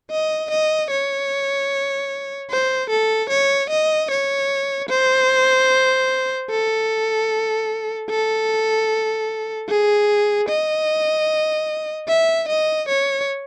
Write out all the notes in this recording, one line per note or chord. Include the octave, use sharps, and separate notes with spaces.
D#5
D#5
C#5
C5
A4
C#5
D#5
C#5
C5
A4
A4
G#4
D#5
E5
D#5
C#5